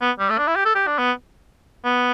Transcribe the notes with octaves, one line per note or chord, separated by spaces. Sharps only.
B3
G3
A3
D4
E4
G4
A4
G4
D4
B3
B3